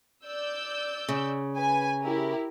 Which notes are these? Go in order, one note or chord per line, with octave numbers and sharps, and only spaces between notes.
D5 E6 G6
C#3
B4 G#5
E4 G4 A#4